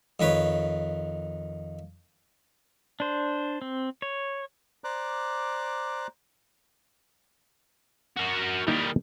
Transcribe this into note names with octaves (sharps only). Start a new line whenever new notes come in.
F2 D#3 B4 C#5
D4 C5
C4
C#5
C5 D5 A#5 D6 F#6
F#4 A#4
D#3 G3 A#3 D#4 E4